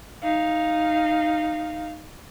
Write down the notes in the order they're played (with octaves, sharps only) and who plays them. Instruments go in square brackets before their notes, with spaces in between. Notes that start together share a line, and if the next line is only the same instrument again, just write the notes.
[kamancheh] D#4 F5